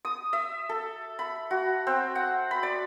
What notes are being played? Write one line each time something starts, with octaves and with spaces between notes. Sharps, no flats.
D#6
E5
A4
B5
F#4
C4
F#5
B5
D5